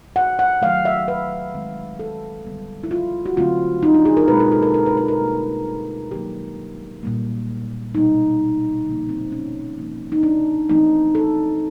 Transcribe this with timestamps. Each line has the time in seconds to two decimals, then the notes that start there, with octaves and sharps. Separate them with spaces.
0.16 F#5
0.39 F#5
0.62 D#3 F#3 A3 F5
0.85 E5
1.08 B4
1.54 D#3 G#3 C4
1.99 A4
2.45 D3 G3 B3
2.83 E4
2.91 F4
3.26 F#4
3.37 D3 F#3 A3 C4 F4
3.83 D#4
3.94 D4
4.05 G#4
4.17 A#4
4.28 B2 G#3 C4 B4
4.40 A#4
4.52 A4
4.63 A#4
4.74 A#4
4.86 B4
4.97 B4
5.08 A#4
5.20 B2 G3 A#3
6.11 D#3 F#3 A#3 G4
7.03 A#2 G3 A#3
7.95 B2 G3 B3 D#4
8.86 D3 F3 A#3
9.09 C4
9.32 C#4
9.78 C3 F3 A#3
10.12 D#4
10.23 D4
10.69 E3 A3 C4 D#4
11.15 A4